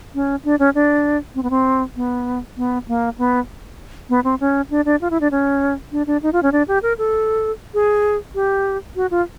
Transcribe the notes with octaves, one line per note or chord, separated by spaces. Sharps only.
C#4
D4
C#4
D4
C4
B3
C4
B3
B3
A#3
B3
B3
C4
C#4
D4
D4
F4
E4
D4
C#4
D4
D4
D#4
F4
C#4
D4
G4
A#4
A4
G#4
G4
F#4
F4